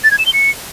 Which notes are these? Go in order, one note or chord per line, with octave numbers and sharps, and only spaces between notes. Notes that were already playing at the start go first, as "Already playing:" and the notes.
A6
G#6
E7
G7
C#7